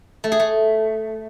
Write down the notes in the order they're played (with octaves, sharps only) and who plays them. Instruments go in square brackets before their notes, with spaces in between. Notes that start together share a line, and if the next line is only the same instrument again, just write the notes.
[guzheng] A3
G#4
A3